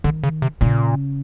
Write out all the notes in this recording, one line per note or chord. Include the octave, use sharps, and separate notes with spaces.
D3 D#3
C#3
C3
A#2 C#3